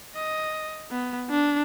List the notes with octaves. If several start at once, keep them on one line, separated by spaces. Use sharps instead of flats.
D#5
B3
D4